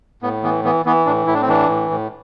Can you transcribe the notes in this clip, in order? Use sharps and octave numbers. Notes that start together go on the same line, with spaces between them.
A2 B3
E3 B3
E3 B3
E3 B3
A2 D4
A2 E4
D4
C4
E3 D4
A2
A2